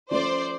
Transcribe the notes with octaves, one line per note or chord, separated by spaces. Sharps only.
F3 A3 C#4 C5 D5